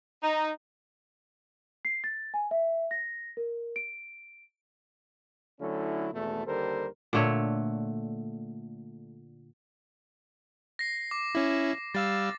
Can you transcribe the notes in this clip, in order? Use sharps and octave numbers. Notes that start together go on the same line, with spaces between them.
D#4
C7
A6
G#5
E5
A#6
A#4
D7
D3 F#3 A3 C#4 E4
G#1 E2 B2 A3
D#2 D3 G3 A4 A#4 C5
A#2 D3 A3 C#5
A#6 C7
D6
C#4 E4
G3 F5 E6 A6